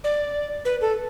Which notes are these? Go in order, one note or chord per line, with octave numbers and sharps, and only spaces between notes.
D5
B4
A4